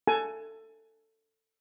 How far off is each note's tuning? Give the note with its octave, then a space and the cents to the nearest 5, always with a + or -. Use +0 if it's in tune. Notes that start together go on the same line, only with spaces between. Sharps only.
A4 +15 G#5 +20